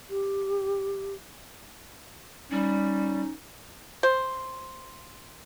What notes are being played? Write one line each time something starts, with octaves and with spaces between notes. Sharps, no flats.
G4
G3 C#4 D#4
C5